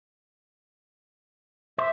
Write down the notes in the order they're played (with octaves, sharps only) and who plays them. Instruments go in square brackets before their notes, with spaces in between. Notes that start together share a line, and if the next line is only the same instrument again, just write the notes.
[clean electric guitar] C5 [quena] E5